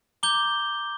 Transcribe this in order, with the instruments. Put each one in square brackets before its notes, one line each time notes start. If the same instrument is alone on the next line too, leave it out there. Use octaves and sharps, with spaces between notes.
[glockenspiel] A#5 D6 G6 G7